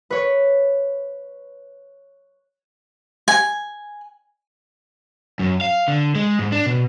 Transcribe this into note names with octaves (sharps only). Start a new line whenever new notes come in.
B4 C#5
G#5
F#2
F5
D3
G#3
G#2
D4
B2